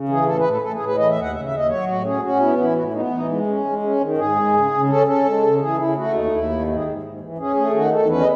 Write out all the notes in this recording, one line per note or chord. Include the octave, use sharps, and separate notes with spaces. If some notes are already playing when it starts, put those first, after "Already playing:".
Already playing: C#3
E3 G#4
A2 A4
B4
A2
A4
A2 A4
G#4
A2
B4
E3 D#5
E5
D#2
F#5
C#3 E5
E5
D#2
D#5
F#3 C#5
A2 F#4
C#4 G#4
C#4 F#4
B3 E4
E3 E4
A2 F#4
E4
B3 D#4
E3 D#4
G#3
C#4
G#3
C#4
D#3
G#2 G#4
G#3
C#3
C#3
C#4 A4
C#4 A4
G#3
C#3
E3 G#4
C#3 E4
A3 F#4
D#2 D#4
D#4
D#2 E4
D#3
G#2 E4
G#4
G#2
G#2
E3
C#4 G#4
A3 G#4
D#3 F#4
E2 A4
C#4 B4
D#5